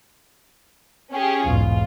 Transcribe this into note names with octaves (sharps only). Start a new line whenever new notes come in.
C#4 G4 G#4
B1 E2 G#2 F4